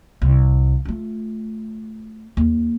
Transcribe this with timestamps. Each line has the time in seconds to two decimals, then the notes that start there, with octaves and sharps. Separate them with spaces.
0.22 C2
0.85 A3 F4
2.37 D#2